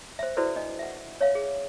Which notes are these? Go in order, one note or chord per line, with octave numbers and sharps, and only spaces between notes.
C5 E5
E4 F#4 A4 B4 C5 D5
D4 D#5
E5 F#5
C#5 E5 F5
G#4